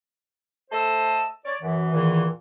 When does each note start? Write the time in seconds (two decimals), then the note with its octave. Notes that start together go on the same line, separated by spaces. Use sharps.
0.70 A3 A4 C5 D#5 E6
1.45 C#5 D5
1.61 F#2 E3
1.92 E2 A#2 D#3 E3